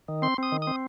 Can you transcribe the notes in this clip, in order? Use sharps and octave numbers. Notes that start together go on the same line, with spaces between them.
D#3
C4 C6
C4 D#6
D#3
D#6
C4